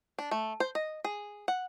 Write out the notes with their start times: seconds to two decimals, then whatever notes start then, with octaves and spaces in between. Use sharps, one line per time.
0.18 D4
0.31 A3
0.60 C5
0.75 D#5
1.04 G#4
1.48 F#5